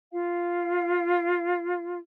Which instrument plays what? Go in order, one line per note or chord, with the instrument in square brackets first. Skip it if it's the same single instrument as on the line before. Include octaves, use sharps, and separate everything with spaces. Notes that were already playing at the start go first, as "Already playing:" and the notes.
[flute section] F4 F5